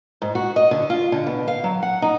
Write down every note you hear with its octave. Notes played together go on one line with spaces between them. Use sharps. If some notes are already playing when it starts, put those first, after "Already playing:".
G#2
F#4
D#5
D3
F4
D3
B2
F5
F#3
F#5
D#4